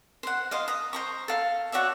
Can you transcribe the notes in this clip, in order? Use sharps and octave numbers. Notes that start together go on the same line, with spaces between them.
C5 F#5
C5 D#5 F5
A#5 D#6
C5 A#5 C#6
A4 F5
F#4 C#5 D5 E5